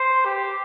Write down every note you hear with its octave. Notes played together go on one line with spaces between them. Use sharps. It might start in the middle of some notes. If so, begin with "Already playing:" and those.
Already playing: C5
G4